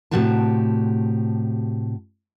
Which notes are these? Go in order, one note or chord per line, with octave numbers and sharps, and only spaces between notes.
A2 C3 G3 F#4 G4 A5